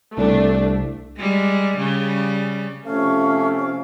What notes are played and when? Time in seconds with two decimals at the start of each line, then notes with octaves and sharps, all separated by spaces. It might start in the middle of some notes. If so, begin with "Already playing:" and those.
0.17 C2 A3 D4
1.17 G3 G#3
1.78 C#3 G3
2.85 C3 F3 A3 C#4 F5